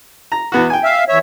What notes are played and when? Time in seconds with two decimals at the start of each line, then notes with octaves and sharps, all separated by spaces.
0.32 A#5
0.52 E2 B3 F#4
0.70 G5 G#5
0.84 E5 F5
1.08 E2 C#5 E5